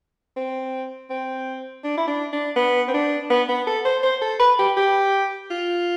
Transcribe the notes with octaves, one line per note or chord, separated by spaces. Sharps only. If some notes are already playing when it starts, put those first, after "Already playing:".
C4
C4
D4
E4
D4
D4
B3
C4
D4
B3
B3
A4
C5
C5
A4
B4
G4
G4
F4